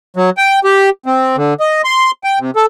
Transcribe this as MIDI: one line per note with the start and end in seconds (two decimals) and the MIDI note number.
0.16 0.30 54
0.37 0.60 79
0.64 0.90 67
1.06 1.36 60
1.37 1.54 50
1.60 1.82 75
1.84 2.11 84
2.24 2.39 79
2.39 2.51 48
2.56 2.66 69